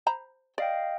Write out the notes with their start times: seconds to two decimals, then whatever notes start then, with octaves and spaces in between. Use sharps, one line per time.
0.07 C5 A#5 B5
0.58 D5 D#5 F5 G5